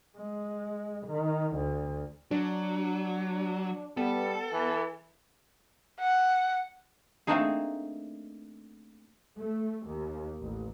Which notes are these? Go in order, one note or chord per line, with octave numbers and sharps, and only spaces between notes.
G#3
D#3
D2
F#3 D4
G3 B3 A4
E3
F#5
A3 A#3 C4 D4 D#4 G#4
A3
D#2
A1